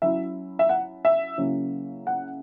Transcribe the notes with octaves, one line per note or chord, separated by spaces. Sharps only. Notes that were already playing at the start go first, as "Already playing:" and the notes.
F#3 C#4 E4 E5
E5
F#5
E5
C#3 F#3 A#3 C#4 E4
F#5